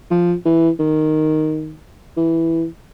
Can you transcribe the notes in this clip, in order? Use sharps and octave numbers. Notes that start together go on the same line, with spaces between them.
F3
E3
D#3
E3